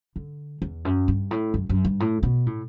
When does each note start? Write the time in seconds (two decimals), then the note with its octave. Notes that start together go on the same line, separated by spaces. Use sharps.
0.16 D3
0.62 E2
0.85 F#2
1.08 G2
1.31 A2
1.54 F#2
1.69 F#2
1.85 G2
2.00 A2
2.23 B2
2.46 A2